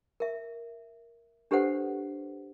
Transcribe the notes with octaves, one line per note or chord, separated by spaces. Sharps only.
A#4 E5
D4 G4 A4 B4 C5 F#5